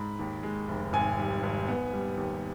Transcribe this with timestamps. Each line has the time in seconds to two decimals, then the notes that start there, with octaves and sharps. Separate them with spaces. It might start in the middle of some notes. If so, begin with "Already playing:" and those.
Already playing: G#2 B5
0.19 D#2
0.43 G#3
0.68 F1
0.93 G#1 G#5
1.19 G3
1.43 G#1
1.68 B3
1.93 G3
2.17 D#2